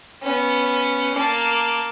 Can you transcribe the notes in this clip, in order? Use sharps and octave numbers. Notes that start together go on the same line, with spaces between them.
B3 C#4
A#3 A5